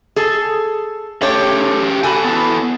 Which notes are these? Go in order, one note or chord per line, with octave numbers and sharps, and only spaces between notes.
G#4 A4
C#3 A3 G4 C#5
F#4 A4 G#5 B5
B3 E4